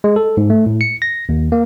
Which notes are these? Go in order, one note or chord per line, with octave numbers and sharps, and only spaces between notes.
G#3
A4
G#2
A3
A2
C#7
A#6
D#2
A#3